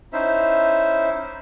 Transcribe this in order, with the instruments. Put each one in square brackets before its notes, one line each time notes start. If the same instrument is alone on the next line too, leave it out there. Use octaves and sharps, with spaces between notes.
[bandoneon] C#4 D#4 E4 C5 E5